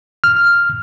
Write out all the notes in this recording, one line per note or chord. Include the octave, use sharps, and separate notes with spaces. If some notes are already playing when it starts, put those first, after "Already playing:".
F6